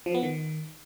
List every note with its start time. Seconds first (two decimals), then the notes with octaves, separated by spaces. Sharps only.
0.06 F3
0.14 B3
0.23 D#3